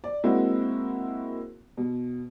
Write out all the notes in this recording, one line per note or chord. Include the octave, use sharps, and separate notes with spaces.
D5
G#3 A#3 C4 E4 F#4
B2